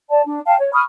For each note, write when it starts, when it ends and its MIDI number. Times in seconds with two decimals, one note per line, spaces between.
0.10 0.23 74
0.10 0.23 81
0.26 0.40 62
0.46 0.56 77
0.46 0.56 79
0.46 0.56 81
0.60 0.73 73
0.73 0.82 83
0.73 0.82 85
0.73 0.82 87
0.73 0.82 89